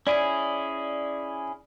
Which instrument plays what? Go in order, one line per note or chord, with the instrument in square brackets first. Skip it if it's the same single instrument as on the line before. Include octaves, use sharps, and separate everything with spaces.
[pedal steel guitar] C#4 E4 G#4 [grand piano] D5